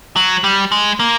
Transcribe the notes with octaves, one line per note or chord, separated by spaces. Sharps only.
F#3
G3
G#3
A#3